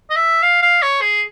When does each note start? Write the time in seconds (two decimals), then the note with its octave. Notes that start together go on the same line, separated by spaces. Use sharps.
0.10 D#5
0.16 E5
0.42 F5
0.62 F5
0.82 C#5
1.01 G#4